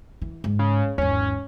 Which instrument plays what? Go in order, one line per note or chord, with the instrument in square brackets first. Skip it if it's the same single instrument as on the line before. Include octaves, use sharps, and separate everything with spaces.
[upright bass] E3
G#2
[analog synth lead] C#3
[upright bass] G#1 E2 [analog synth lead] C#4